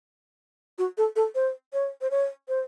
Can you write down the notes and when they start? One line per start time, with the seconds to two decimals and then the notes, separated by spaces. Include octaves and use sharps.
0.78 F#4
0.98 A4
1.16 A4
1.35 C5
1.73 C#5
2.01 C5
2.11 C#5
2.49 C5